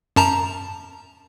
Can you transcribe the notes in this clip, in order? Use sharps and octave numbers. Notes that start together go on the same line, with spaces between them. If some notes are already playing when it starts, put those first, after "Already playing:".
F#2 A5 A#5